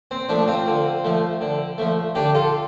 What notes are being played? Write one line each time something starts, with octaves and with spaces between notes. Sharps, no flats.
C4
F3 A3 D4
C4 F4
D3
F3 A3
D3
F3 A3
D3 D4 G4
F4 A4